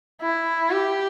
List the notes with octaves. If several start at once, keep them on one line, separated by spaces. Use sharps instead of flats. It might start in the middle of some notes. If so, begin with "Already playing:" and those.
E4
G4